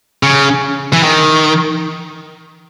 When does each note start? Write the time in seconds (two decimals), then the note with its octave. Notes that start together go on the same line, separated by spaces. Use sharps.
0.23 C#3
0.93 E3
1.03 D#3